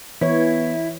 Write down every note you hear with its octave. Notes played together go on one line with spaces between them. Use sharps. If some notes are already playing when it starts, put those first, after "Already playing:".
E3 B3 E4 C#5